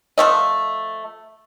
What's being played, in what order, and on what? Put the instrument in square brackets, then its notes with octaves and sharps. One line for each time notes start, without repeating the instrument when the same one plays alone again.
[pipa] F3 A3 D#5